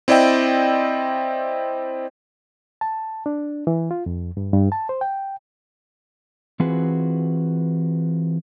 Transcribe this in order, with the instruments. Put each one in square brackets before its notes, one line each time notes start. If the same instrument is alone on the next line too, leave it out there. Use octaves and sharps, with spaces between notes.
[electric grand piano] C4 E4 D5 D#5 G5
[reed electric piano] A5
D4
E3
F4
F2
G2
G2
A5
C5
G5
[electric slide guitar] E3 C4 F4 F#4 G#4 B4